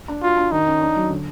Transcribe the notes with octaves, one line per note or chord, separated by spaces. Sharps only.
D4
F4 F#4
D4
D#3 D#4
C#4
D4
F#3
D3